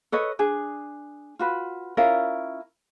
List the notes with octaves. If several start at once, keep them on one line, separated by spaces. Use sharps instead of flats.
A4 B4 C#5 D#5
D4 G#4
F4 F#4 B4
C#4 E4 F4 A#4